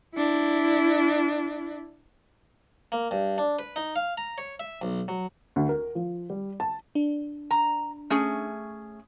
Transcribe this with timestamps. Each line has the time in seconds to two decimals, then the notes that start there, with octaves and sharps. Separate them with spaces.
0.15 D4 E4
2.92 A#3
3.11 G2
3.38 D4
3.59 B4
3.76 D#4
3.96 F5
4.17 A#5
4.38 C#5
4.60 E5
4.82 B1
5.08 F#3
5.56 D2
5.69 A#4
5.95 F3
6.30 G3
6.60 A5
6.95 D4
7.51 A#5
8.10 A3 C#4 G#4